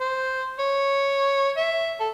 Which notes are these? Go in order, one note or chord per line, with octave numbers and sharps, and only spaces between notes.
C5
C#5
E5
A4